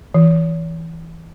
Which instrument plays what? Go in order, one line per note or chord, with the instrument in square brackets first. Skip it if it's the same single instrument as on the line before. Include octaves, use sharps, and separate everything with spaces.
[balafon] E3